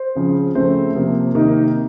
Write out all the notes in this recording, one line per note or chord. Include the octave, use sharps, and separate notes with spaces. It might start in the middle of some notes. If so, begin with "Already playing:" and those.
Already playing: C5
C#3 F3 C4
C#3 F3 A3 C4 C5
C3 F3 A#3
C3 D#3 A#3 D#4